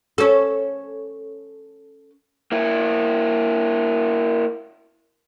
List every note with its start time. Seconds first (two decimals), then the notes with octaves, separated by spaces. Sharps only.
0.18 C#4 A4
2.52 A#3 E4